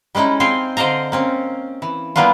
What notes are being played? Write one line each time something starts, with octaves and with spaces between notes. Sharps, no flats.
G3 G#3 C#4 D#4 E4
C4 C5 F5 G5 G#5
D3 C5 D5 D#5 F5 A#5
A#3 C4 C#4
E3
E3 G3 A#3 B3 D4 F4